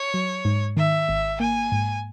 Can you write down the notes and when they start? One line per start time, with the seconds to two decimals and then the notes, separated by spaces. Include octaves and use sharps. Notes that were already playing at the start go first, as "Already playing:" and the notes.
Already playing: C#5
0.14 F#3
0.45 G#2
0.77 D#3 E5
1.09 G#1
1.40 A#3 G#5
1.72 G#2